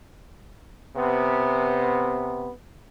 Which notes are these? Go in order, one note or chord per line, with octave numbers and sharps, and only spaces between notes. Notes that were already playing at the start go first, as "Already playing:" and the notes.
C3 B3